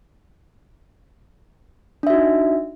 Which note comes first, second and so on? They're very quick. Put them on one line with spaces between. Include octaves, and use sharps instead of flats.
D4 E5 F#4 D#4